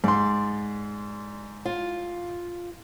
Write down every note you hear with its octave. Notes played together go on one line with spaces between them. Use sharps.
G#2 D5 C6
F4